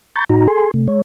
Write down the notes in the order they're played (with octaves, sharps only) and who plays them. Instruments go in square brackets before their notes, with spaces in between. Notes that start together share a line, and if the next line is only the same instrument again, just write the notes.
[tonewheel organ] A#5 B5 C#6 G6 A6
A2 D#4 F#4 A#5
G#4 A4 G#5 C6
C3 A3
G#3 C#5